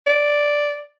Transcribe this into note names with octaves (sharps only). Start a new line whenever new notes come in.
D5